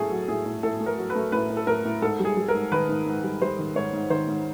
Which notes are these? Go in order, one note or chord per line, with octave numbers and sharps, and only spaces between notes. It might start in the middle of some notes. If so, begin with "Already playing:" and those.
Already playing: A2 A3 G#4 A4
F#3
A2 G#4
A2
A2 A4
A3
A#4
F#3
B4
A3
A2 B4
A2
A4
A2 A#4
A2
G#2 A4
G3
G#4
G3
A#4
G#2
D#3 B4
G#2
G#2
G3
G3 C5
D#3
G#2 C#5
G#2
D#3 C5
G#2